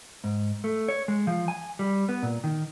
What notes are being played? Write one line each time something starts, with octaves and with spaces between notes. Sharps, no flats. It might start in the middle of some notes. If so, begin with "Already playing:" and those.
G#2
A3
C#5
G#3
F3
G#5
G3
B3
A#2
D#3